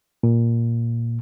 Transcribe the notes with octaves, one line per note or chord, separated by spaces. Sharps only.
A#2